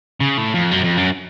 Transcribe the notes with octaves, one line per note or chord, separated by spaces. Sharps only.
C#3
A2
F2
F#2
F2
F#2